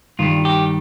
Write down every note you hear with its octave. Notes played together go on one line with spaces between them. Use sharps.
G2 D#3 G3 F4
G4